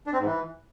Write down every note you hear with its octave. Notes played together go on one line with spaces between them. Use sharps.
D4
C4
G#2
E3